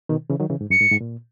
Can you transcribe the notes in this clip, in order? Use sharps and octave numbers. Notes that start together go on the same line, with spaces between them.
B2 D#3
C#3 E3
D#3 F#3
C#3 E3
G#2
F#2 C#7
G#2
G#2
A#2